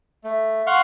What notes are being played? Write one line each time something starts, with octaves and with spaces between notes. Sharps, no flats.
A3
F5 F#5 C6 C#6